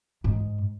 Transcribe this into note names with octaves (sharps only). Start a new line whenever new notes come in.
G#2